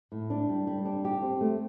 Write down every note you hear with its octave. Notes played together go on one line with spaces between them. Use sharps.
A2
D4
G3
G3
D4
G4
C4
A3